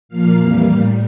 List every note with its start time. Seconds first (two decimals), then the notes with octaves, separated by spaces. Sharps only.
0.09 A#2 F3 A#3 F5
0.37 F2 E3 G3 A#3
0.65 A2 G3 A#3